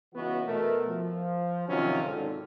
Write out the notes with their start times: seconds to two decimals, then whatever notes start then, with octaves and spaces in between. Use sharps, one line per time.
0.14 C#2 E3 B3 F#4
0.47 B2 A3 A#4
0.88 F3
1.68 C3 D#3 F3 F#3 C#4 F4
2.04 G#1 D3